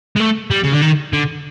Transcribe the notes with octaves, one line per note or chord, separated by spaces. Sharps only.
G#3
A3
G3
C#3
D3
D#3
D3